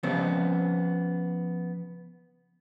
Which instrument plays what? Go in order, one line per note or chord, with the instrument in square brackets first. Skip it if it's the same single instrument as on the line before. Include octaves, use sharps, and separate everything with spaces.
[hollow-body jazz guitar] C#3 F3 G3 B3 C4